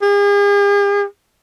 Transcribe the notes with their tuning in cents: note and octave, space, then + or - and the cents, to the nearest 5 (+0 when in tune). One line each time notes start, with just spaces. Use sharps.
G#4 -45